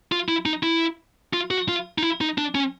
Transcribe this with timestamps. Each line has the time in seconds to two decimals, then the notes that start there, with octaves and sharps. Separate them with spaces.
0.12 F4
0.29 E4
0.46 D#4
0.63 E4
1.33 F4
1.51 F#4
1.69 F4
1.98 D#4
2.03 E4
2.21 D#4
2.38 D4
2.55 C#4